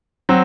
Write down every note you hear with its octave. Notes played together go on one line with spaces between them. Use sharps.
F#3 C4